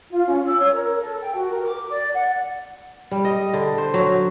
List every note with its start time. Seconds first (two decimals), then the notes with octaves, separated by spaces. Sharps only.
0.09 F4
0.27 C#4
0.45 E6
0.59 C#5
0.72 A#4
0.98 A4
1.20 G5
1.33 F#4
1.50 A#4
1.64 D6
1.90 D5
2.14 F#5
3.11 G3
3.25 D#5
3.54 D3
3.78 C5
3.94 F#3